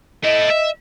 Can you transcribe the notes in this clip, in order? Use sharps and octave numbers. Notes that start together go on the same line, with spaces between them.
A3 E4 D#5
E5